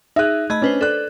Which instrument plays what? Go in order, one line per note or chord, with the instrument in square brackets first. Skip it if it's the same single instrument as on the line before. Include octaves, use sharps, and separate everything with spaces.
[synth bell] D#4 G#4 [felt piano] E5 F#6
[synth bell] A3 D#5 B5 [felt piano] G#6
[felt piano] C#4 [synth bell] D4 B4 C5
[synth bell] A4 [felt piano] D5 F#6